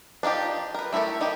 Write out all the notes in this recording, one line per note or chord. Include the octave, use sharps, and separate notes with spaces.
D4 D#4 F4 G4
A#4 B4
A3 E4 G4 A4 A#4
D#4 E4 G4